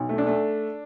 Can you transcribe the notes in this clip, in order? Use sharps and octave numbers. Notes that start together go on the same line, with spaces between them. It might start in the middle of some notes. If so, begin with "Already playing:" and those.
Already playing: B1
A3
D4
A3